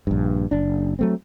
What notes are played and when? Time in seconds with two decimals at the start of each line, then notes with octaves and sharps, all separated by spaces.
0.07 A#1 G2
0.51 F#1 D4
0.99 F#3 A3 C4